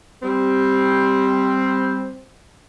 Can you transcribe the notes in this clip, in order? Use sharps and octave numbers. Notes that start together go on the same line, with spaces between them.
G3 C4